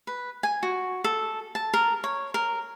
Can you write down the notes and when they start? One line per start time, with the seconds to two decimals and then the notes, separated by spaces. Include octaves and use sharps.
0.07 B4
0.43 G#5
0.63 F#4
1.04 A4
1.55 A5
1.74 A#4
2.04 C#5
2.34 A#4